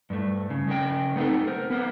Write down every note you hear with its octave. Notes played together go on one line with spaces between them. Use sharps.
G2 A3
C#3
C#3 C#4 A#4 G5
A3 B3 C4 D#4 A4
A#4 C5
B3 A#4 B4